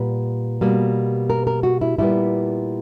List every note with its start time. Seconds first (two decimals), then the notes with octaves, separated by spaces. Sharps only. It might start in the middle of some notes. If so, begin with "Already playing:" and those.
Already playing: A#2 G3 B3 B4
0.61 B2 G3 A#3
1.30 A#4
1.47 A#4
1.63 F#4
1.81 E4
1.98 A#2 G3 B3 E4